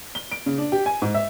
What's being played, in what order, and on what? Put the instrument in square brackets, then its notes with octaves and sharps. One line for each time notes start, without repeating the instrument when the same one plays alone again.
[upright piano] G7
D7
C#3
D4
G4
G#5
G#2
E5